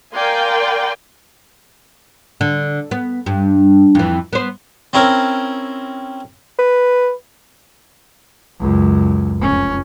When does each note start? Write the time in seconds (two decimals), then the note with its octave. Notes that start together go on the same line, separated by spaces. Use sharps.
0.13 A#4 D5 F5 G5 G#5 C6
2.41 D3
2.91 B3
3.26 G2
3.95 F2 E3
4.33 B3 C5
4.93 C4 C#4 E4 A#4 C#5
6.59 B4
8.60 C#2 F#2
9.39 F1 C#4